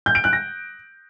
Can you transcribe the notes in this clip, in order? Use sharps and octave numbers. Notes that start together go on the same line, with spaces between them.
G6
D7
F#6
A#6